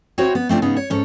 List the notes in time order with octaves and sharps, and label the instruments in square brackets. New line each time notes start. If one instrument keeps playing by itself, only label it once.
[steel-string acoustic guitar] C4 E4 F#4 C5 C#5
B3
A3 C4 D4 F4
G#2 C#3 B3 D#4 G#4
C#5
G#2 C#4 A4